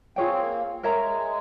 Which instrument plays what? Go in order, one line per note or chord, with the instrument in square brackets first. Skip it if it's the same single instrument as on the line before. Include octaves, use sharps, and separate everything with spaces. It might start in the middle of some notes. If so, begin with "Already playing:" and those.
[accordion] C4 [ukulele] F4 G#4 C#5 G5
[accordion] A#3
[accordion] G#3 [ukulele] A#4 C#5 E5 A#5